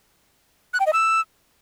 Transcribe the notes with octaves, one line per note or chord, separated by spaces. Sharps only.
F#6
G5
D#5
E6